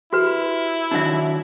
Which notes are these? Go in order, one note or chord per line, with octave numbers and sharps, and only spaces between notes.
E4 F#4 G4 B4
D#3 F#3 D4 D#4 E5